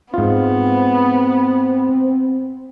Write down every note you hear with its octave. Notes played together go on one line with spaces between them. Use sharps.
G#2 B3 C4 F4